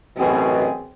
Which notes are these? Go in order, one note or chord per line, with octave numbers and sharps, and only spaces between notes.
A1 F#2 B2 C4 G#4